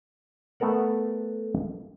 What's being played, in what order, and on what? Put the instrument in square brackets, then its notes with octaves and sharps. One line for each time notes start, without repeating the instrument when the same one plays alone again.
[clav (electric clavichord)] A3 B3 A4 A#4 F#5